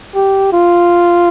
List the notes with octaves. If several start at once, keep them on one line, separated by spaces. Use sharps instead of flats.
G4
F4